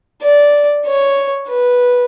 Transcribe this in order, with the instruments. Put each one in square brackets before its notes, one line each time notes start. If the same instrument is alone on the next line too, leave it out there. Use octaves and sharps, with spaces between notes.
[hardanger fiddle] D5
C#5
B4